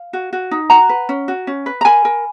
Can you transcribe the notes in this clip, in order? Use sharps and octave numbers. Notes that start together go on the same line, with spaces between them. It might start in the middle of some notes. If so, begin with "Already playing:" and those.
Already playing: F5
F#4
F#4
D#4
F#4 F#5 A#5
B4
C#4
F#4
C#4
B4
A#5
A#4 G#5 B5
A#4